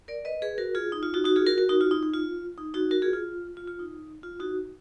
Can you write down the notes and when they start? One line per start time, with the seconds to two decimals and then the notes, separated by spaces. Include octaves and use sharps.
0.08 A#4 D5
0.25 B4 D#5
0.42 G#4 B4
0.58 F#4 A#4
0.75 F4 G#4
0.92 D#4
1.03 F4
1.14 D#4 F#4
1.24 D#4 F#4
1.36 F4 G#4
1.46 F#4 A#4
1.58 F#4 A#4
1.69 D#4 F#4
1.81 F4
1.91 D#4
2.03 D#4
2.14 F4
2.58 D#4
2.74 D#4 F#4
2.91 F#4 A#4
3.02 F4 G#4
3.13 F4
3.57 F4
3.68 F4
3.79 D#4
4.23 F4
4.40 D#4 F#4